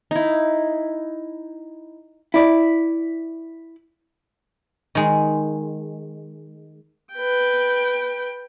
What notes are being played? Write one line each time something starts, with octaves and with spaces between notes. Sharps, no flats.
D#4 E4
E4 D5
D#3 G#3
B4 G5